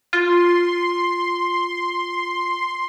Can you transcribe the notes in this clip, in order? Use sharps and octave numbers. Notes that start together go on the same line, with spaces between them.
F4 C6